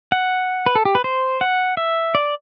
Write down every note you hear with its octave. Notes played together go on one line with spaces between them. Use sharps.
F#5
B4
A4
G4
B4
C5
F#5
E5
D5